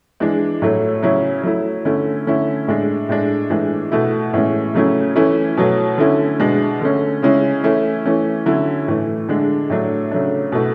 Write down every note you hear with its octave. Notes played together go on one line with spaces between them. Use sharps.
E3 G#3 D4
A2 F#3 A3 E4
C#3 F#3 C#4 E4
F#3 A3 E4
D3 A3 C#4 E4
D3 A3 C#4 E4
A2 G#3 D4
A2 G#3 D4
A2 E3 G#3 D4
B2 A3 E4
A2 E3 G#3 C#4
C#3 F#3 A3 C#4 E4
E3 A3 C#4 E4
B2 F#3 A3
D3 A3 C#4 E4
B2 G#3 D4
D3 A3 C#4
C#3 G#3 C#4 E4
E3 A3 C#4 E4
E3 A3 C#4
D3 F#3 C#4 E4
A2 E3 A3
D3 G#3 D4
A2 F#3 A3 D4
C#3 F#3 A3 D4
B2 A3 E4